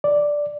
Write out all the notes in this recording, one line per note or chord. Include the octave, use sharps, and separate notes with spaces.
D5